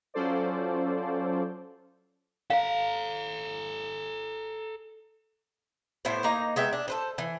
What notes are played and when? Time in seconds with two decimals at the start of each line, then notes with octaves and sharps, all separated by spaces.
0.14 F#3 C#4 F4 A4 C5 D5
2.50 A4 F5 A#5
6.05 A2 B3 E4 C5
6.24 A#3 D#4 A#5
6.56 G#3 B3 E5 G5
6.73 D4
6.88 A4 B4 C5
7.18 E3